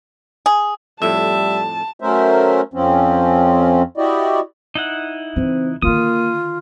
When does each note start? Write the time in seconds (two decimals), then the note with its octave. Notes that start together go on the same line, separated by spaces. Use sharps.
0.46 G#4
1.02 F2 A2 G3 E5 A5
2.00 F#3 A3 C#4 A#4 C5 E5
2.74 F2 F3 C4 C#4
3.97 E4 F#4 G4 D5 D#5
4.75 D#4 E4 F#5
5.36 C#3 E3 C4
5.82 D3 D#3 A#3 F4 D#6